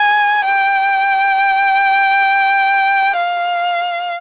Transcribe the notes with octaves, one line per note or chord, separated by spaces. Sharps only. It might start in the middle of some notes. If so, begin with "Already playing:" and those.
Already playing: G#5
G5
F5